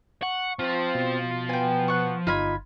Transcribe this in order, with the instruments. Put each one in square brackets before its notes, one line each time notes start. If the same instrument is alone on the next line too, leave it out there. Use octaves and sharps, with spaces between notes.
[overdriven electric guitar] F#5 [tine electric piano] C#6
[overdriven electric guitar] F3 [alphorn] C4
[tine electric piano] B2
[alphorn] B3 [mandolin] G5 G#5
[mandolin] F#5 C#6
[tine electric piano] G1 G#6 [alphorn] D#4 [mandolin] F4 B5